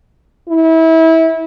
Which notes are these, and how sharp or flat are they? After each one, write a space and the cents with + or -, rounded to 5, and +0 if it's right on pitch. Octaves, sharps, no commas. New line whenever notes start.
E4 -25